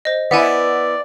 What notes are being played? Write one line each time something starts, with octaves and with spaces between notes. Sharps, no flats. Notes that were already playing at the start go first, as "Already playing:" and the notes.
C5 D#5
B3 E4 D5 E5 F#5 G#5